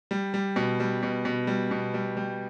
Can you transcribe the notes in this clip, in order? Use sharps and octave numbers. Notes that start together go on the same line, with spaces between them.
G3
G3
B2
G3
B2
B2
G3
B2
G3
G3